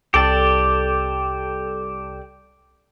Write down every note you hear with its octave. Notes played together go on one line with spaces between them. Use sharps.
C2 G4 A4 D5 E7